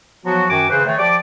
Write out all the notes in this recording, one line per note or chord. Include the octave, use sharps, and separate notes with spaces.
F3 F#3 B3 F#4
F#2 D#3 C#4 F#4 G#5 D6
C#3 E3 B4 C5
D#3 A3 C#5
F3 G4 D5 D6